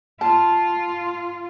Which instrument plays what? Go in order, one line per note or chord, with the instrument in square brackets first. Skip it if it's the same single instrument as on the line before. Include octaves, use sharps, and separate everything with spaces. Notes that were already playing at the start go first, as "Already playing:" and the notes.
[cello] F4 [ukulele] A5